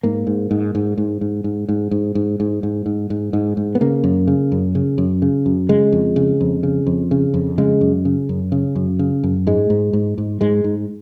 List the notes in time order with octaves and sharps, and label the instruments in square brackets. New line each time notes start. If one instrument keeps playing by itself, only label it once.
[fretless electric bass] G#2 A#3
G#2
G#2
G#2
G#2
G#2
G#2
G#2
G#2
G#2
G#2
G#2
G#2
G#2
G#2
G#2
B3
C#3 A#3
F#2
C#3
F#2
C#3
F#2
C#3
F#2
C#3 G#3
F2
C#3
F2
C#3
F2
C#3
F2
C#3 G#3
F#2
C#3
F#2
C#3
F#2
C#3
F#2
G#2 G#3
G#2
G#2
G#2
G#2 G#3
G#2